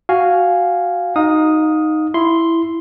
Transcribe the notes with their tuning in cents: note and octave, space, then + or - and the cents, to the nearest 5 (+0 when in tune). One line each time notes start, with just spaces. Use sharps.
F#4 +0 F5 +0 G#5 +0
D#4 +0 F5 +35 D#6 +0
E4 +5 C6 +0